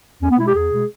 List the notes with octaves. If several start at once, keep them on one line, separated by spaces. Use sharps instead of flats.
E2 C#4
B3
B2 G#3 E4
G4
E2 G#4
B2 G#3